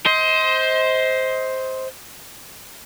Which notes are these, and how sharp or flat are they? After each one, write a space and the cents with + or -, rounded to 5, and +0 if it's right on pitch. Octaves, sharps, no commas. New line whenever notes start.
C5 +0 D#5 +30